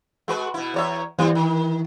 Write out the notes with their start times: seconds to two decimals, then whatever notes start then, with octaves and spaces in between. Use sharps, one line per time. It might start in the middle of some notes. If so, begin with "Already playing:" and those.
0.28 G#3 F#4 B4
0.54 B2 E4
0.74 E2 C#5 E5
1.18 E3 G3 C4 F4
1.35 D#3